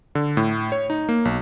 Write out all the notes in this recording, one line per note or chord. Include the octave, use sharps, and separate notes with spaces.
D3
A2
C#5
D#4
A#3
B1